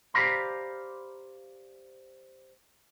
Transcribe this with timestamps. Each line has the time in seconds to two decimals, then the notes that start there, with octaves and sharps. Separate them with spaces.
0.14 G4 C5 D5 F5 A#5 B5